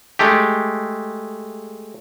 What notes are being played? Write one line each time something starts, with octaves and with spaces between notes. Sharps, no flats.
G#3 A3 G4